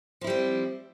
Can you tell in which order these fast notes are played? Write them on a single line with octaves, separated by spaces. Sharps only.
F3 E4 G3 C4